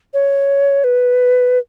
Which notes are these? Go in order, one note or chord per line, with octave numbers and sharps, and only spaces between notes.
C#5
B4